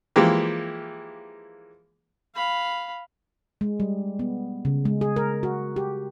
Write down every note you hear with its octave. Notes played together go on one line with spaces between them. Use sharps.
E3 F3 G#3 A#3 G4
F5 B5
G#3
G3
B3
C#3
G#3
G#4
A#4
F#4
G4